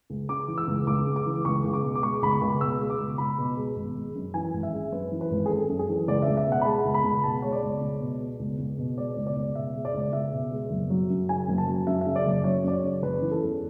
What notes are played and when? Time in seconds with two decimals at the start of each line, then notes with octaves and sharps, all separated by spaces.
0.10 C#2
0.29 C#3 D6
0.48 E3
0.58 E6
0.67 C#2
0.87 C#2 D6
1.07 C#3
1.16 D6
1.26 E3
1.45 C#2 C#6
1.64 C#2
1.73 D6
1.83 B2
1.95 D6
2.03 G#3 C#6
2.22 C#2 B5
2.31 C#6
2.41 C#2
2.61 B2 E6
2.80 G#3
2.90 D6
2.99 C#2
3.18 C#2 B5
3.38 B2
3.57 G#3
3.76 G#1
3.96 G#3
4.15 F#2
4.34 E3 G#5
4.54 G#1
4.63 E5
4.73 G#3
4.92 F#2 B4
5.12 E3
5.21 B4
5.31 G#1
5.46 G#4
5.50 G#3 A4
5.69 F#2
5.79 G#4
5.89 E3
6.08 C#2 D5
6.22 E5
6.27 C#2
6.37 E5
6.47 B2 F#5
6.61 B5
6.65 G#3 A5
6.85 C#2
6.94 B5
7.04 C#2
7.24 B2 A5
7.42 G#3 C#5
7.52 D5
7.63 C#2
7.81 C#2
8.01 B2
8.20 G#3
8.39 C#2
8.59 C#2
8.78 B2
8.98 G#3 D5
9.17 C#2
9.26 D5
9.36 C#2
9.55 B2 E5
9.75 G#3
9.85 D5
9.94 C#2
10.13 C#2 E5
10.32 B2
10.52 G#3
10.70 F#1
10.90 F#3
11.10 F#2
11.29 C#3 G#5
11.49 F#1
11.58 A5
11.68 F#3
11.87 F#2 E5
12.01 C#3 E5
12.16 D5
12.25 F#1
12.44 F#3 C#5
12.64 F#2 D5
12.73 C#5
12.83 C#3
13.02 F#1 B4
13.22 E3
13.31 A4
13.42 E2